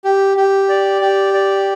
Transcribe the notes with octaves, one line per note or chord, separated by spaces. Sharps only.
G4
G4
D5
G4
D5